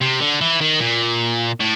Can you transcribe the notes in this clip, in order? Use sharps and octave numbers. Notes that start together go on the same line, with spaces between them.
C3
D3
E3
D#3
A#2
A2